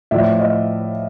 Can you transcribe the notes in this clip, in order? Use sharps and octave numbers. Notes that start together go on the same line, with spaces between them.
A2 F3 D5 E5
D#5 F5